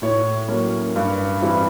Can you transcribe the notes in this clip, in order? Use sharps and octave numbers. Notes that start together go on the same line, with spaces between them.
A2 C#5
F#3 A#3 C#4
G2
E3 G3 C4 E4